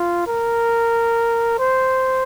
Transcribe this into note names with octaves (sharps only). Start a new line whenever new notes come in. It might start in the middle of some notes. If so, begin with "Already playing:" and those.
Already playing: F4
A#4
C5